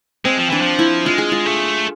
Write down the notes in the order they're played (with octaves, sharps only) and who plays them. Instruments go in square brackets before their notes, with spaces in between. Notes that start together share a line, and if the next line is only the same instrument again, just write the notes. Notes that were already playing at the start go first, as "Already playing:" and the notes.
[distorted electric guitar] G#3 [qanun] C4
[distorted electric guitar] F3
[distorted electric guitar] E3 [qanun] D4
[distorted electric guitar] F3
[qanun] E4
[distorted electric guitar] G#3 [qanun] F4
[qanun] G#4
F4
[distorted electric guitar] A3